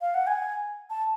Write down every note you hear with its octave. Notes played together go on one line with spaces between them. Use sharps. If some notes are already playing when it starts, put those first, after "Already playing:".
F5
F#5
G#5
A5